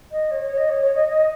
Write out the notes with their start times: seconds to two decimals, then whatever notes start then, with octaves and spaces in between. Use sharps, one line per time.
0.11 D#5
0.31 C#5
0.43 C#5
0.57 D#5
0.69 C#5
0.82 C#5
0.95 D#5
1.08 D#5